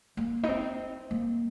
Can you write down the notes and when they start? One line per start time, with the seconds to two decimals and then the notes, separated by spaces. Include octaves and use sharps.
0.17 A#3
0.43 D#4
0.49 C4
1.11 A#3